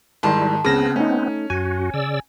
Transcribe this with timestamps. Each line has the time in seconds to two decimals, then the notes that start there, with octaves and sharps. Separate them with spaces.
0.23 G#2 D#3 G3 E4 A5 C6
0.65 C#2 C#3 B3 C4 A#6 E7
0.96 A3 C#4 D#4
1.50 F#2 F#4 G#5
1.94 C#3 D5 E6